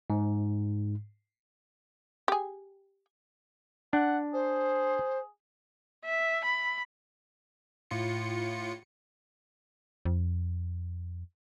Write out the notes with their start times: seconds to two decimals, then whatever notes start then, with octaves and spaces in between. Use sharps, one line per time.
0.10 G#2
2.28 G4 G#4
3.93 D4 F#5
4.33 G#4 C5
6.05 E5
6.44 B5
7.91 A2 F4 C#7
10.05 F2